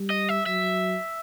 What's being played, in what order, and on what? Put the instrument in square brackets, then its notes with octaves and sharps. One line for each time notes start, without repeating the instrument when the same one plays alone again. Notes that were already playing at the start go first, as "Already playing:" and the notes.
Already playing: [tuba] G3
[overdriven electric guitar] D#5
E5
[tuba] F#3 [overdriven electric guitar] E5